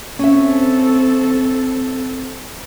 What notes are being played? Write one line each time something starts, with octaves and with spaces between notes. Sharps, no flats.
C4 C#4 A4 E5